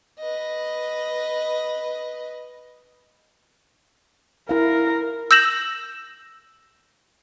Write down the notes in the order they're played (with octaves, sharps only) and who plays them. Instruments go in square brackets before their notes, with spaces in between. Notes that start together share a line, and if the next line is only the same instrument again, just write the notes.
[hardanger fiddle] B4 D#5
[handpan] E4 F5 [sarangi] A#4
[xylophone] E6 G6 A#6 E7 F#7